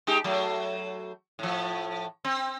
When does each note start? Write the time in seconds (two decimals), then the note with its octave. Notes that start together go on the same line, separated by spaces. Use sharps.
0.07 G#3 D#4 G4
0.24 F#3 A3
1.39 A2 F3
2.24 C4